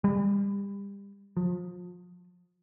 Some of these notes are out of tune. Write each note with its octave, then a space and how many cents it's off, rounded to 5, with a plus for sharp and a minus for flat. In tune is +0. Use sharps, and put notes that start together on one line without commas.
G3 +30
F3 +30